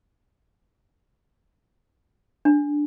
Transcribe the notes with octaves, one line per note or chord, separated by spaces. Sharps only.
D4